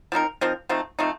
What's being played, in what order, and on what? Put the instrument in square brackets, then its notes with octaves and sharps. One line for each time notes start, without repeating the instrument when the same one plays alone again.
[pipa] F3 C4 D#4 A#4
F3 C4 D#4 A#4
F3 A3 C4 D#4
F3 A3 C4 D#4